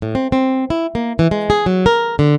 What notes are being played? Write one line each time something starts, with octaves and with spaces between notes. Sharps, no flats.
A2
C4
C4
E4
A#3
E3
G#3
G#4
F#3
A#4
D3